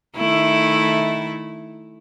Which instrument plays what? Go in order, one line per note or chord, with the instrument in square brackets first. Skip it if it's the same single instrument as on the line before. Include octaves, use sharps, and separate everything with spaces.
[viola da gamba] D#3 A3 E4